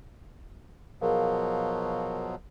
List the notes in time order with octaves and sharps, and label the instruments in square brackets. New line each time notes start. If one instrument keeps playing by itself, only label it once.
[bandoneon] B2 F3 F#3 [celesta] G#4 A#4 F5